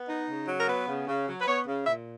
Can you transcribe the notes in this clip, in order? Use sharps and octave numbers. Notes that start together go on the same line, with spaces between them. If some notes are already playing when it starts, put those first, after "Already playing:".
Already playing: B3
D#4
C#3
F#3
A#4
B3 B4
C#3
C#3
F#3
B4
B3 C#5
C#3
A#2 E5